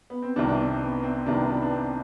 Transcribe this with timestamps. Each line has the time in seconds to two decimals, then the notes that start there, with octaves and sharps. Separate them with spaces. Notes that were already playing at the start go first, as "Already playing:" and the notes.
0.10 B3
0.22 C4
0.36 C2 C3 D#3 B3 D4
0.48 D4
0.60 C4
0.82 B3
1.03 C4
1.17 C4
1.26 C2 C3 D#3 B3 D4
1.48 B3 D4
1.62 D4
1.71 C4